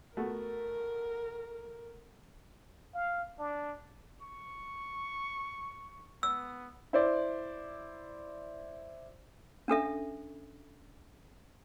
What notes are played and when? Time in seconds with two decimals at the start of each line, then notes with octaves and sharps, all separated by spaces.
0.17 A3 B3 F#4 A#4
2.94 F5
3.39 D4
4.22 C#6
6.23 B3 E6
6.93 E4 C5 D5
9.68 C#4 D4 A4 E5